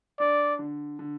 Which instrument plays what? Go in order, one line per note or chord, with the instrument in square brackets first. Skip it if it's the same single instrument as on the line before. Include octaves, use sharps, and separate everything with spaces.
[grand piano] D4 [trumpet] D5
[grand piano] D3
D3